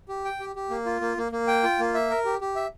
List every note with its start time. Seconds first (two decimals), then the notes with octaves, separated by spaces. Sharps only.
0.09 G4
0.25 G5
0.40 G4
0.56 G4
0.70 A#3
0.86 F4
1.01 A#3
1.17 A#3
1.32 A#3
1.47 G5
1.63 F4
1.79 A#3
1.94 E5
2.10 A#4
2.25 G4
2.41 G4
2.56 E5